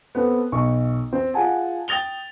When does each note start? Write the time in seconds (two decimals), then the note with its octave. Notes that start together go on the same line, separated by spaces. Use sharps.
0.15 B3 C4 A4
0.52 B1 C#6
1.13 C4
1.34 F4 G#4 F#5 G#5 A5
1.88 G5 D#6 A6 F7 G7